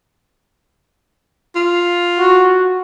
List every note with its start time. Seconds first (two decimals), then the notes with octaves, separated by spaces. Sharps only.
1.56 F4
2.19 F#4